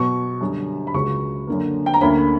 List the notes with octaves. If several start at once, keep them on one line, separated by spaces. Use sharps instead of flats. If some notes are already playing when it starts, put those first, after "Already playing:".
Already playing: B2 F#3 B3 C#6
F#2 D3 G3
B5
C#2 C#3 F#3 C#4 C#6
F#2 D3 A#3
G5
A#5
D2 D3 A#3 C#4 B5